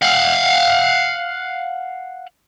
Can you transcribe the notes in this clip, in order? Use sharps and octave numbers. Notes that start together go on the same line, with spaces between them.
F5 F#5